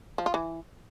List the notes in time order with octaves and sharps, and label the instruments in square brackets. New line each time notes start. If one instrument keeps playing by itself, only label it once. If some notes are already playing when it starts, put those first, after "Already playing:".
[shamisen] F3
F4
E3